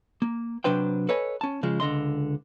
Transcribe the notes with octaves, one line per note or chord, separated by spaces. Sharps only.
A#3
C3 F#3 D4 B4 C5 G5
A4 B4 C#5 D#5 G#5
C#4 A5
C#3 F3 G#3
C#2 D3 D#5 C6